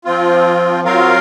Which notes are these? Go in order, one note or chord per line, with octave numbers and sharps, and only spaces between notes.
F3 C4 F4
F#3 C4 F4 A#4 F5